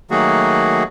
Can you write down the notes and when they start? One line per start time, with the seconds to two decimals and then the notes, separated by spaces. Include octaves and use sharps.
0.11 D#3 F#3 A3 A#3 F#4 G#4